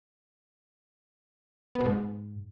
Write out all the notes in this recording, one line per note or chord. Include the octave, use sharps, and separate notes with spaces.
B3
B2
G#2